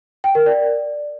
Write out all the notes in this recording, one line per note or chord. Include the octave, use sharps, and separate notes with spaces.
G5
A#4
D5